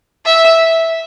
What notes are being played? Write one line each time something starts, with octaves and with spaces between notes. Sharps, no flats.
E5